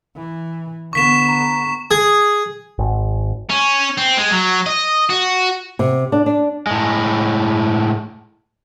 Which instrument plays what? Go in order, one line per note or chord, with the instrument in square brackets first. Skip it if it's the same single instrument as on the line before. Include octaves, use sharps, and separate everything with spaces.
[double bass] E3
[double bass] D3 B3 [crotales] C#6 B6 E7
[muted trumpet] A#5
[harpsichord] G#4
[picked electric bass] G#1
[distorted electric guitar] C#4
C4
G#3
F#3
D#5
F#4
[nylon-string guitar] C3
D4
D4
[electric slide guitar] A2 G#3